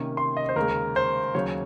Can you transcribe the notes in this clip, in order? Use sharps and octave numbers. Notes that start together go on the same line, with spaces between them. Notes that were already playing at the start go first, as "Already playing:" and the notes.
Already playing: C3 D#3 A#3 C#4
C6
D#5
C5
D#2 C#3 G#3 A#4
C5
D#2 C#3 F#3 C#5